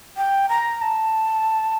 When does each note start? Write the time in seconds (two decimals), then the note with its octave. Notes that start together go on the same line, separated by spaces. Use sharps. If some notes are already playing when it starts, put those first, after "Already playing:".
0.17 G5
0.49 A#5
0.82 A5